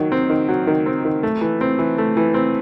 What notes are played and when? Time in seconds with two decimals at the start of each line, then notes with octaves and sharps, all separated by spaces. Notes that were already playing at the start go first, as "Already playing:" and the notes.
Already playing: D#3 F#3
0.12 C4
0.30 D#3
0.49 F#3
0.67 D#3
0.86 C4
1.05 D#3
1.23 A3
1.41 E3
1.61 C4
1.79 E3
1.98 A3
2.17 E3
2.34 C4